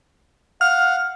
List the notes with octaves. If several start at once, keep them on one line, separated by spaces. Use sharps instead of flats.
F5 F#5 F6